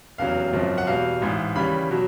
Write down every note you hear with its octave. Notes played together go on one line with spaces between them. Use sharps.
F1 E2 C#3 F#3 F5
G#1 F#2 C#3 F3
F#5
E2 B2 G3 F5
A1 G#2 E3
D#2 C#3 E3 G3 B5
B2 F#3